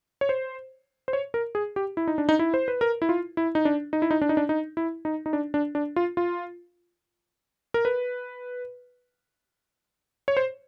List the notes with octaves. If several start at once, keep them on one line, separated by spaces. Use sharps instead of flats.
C#5
C5
C5
C#5
A#4
G#4
G4
E4
D#4
D4
D#4
E4
C5
B4
A#4
E4
F4
E4
D#4
D4
D#4
E4
D#4
D4
D#4
D4
D#4
E4
D#4
D#4
D4
D4
D4
F4
F4
A#4
B4
C#5
C5